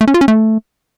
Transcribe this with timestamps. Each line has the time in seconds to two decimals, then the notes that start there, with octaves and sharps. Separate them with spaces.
0.01 A3
0.08 C#4
0.14 F4
0.21 C#4
0.28 A3